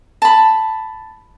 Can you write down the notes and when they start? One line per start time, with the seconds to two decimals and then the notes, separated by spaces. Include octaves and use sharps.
0.22 A5 B5